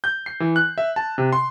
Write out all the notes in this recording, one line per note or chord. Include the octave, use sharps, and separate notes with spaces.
G6
C7
E3
F#6
E5
A5
C3
C6